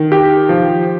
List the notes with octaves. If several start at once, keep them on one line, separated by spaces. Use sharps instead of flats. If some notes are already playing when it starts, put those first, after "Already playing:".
Already playing: D#3
G4
F3